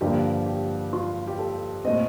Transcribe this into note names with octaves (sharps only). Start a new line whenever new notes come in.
G2 D3 F3 A#3 G4
G4
F4
G4
A4
A#2 A3 C4 D#5